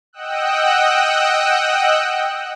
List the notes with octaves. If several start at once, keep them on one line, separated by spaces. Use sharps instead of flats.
D#5 F#5 G5 D#6 E6 F#6